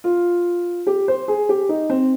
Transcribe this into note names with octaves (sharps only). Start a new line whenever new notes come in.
F4
G4
C5
G#4
G4
D#4
C4